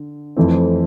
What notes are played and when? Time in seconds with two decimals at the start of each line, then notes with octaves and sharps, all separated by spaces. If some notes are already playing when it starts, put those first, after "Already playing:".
Already playing: D3
0.37 F2 E3 A3 C4